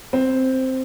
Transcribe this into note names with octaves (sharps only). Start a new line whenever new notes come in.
C4